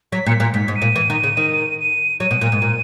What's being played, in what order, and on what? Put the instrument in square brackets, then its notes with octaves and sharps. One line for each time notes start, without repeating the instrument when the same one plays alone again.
[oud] F#3 [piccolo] B6
[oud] A#2 [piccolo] C#7
[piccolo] B6
[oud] A#2
[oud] G#2 [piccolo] B6
[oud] G#2
[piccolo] D#7
[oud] A#2
E3
D#3
C#3
D#3
[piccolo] D#7
[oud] F#3 [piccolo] D#7
[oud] B2
A#2
G#2
A#2